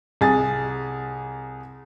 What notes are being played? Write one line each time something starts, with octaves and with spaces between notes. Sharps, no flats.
C2 G#4 A6